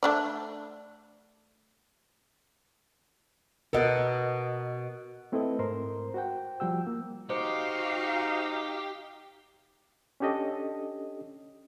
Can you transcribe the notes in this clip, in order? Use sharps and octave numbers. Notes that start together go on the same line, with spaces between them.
A3 D4 D5
B2 B3 A4 A#4 D#5
A3 C4 E4 A4 B4 D#5
G#2 A#4 C5 C6
F#4 C5 F#5 G5
F3 G3 G5 E6
A#3
D#4 F#4 G4 C5 F5
C#4 D4 G4 A4 D#5